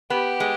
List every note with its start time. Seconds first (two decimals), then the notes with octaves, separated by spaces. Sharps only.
0.10 B3 G4
0.40 G#3